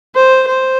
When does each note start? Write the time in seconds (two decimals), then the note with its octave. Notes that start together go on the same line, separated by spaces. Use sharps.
0.15 C5
0.48 C5